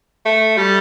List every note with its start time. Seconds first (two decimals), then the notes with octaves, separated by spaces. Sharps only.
0.25 A3
0.57 G3